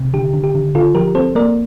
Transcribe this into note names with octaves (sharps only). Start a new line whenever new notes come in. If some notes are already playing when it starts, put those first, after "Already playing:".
Already playing: C3
D3 G4
D3
G4
D3
D3 F4 A4
F3 G4 A#4
C4 A4 C5
A#3 A#4 D5